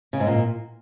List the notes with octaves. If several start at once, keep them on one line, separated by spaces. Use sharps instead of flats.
C#3
G#2
A#2